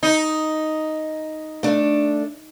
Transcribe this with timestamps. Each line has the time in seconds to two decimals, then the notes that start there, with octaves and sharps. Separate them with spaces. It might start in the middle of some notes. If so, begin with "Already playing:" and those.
0.03 D#4
1.63 A3 D4